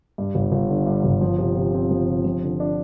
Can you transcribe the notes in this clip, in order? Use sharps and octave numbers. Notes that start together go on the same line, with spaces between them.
G2
G1
G1
D3
G2
G1
F3
C3
C3
C4
F3
C3
F3
D3
D4